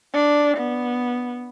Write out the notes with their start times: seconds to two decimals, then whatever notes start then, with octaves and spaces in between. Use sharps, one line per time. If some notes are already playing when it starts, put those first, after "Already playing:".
0.14 D4
0.57 B3